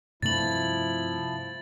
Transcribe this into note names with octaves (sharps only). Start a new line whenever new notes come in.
G2 C3 F3 A3 E4 A6 F#7